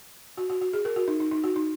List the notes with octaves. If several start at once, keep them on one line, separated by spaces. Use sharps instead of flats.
F#4
F#4
F#4
G#4
A#4
F#4
D#4
D#4
D#4
F#4
D#4